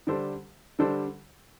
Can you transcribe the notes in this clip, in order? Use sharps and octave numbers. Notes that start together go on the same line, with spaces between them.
D3 G3 D4 A4 C5
D3 G3 D4 A4 C5